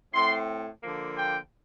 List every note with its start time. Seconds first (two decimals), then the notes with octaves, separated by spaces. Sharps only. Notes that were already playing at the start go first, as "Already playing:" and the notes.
0.14 A2 A3 C4 C6
0.83 D3 F3 A#3
1.16 G5